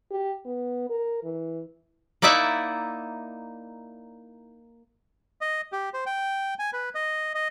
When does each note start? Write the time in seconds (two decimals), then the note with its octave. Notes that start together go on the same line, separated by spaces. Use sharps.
0.11 G4
0.45 B3
0.90 A#4
1.24 E3
2.22 A#3 D#4 E4 D5 E5 F#5
5.41 D#5
5.72 G4
5.94 C5
6.06 G5
6.59 G#5
6.73 B4
6.95 D#5
7.35 D#5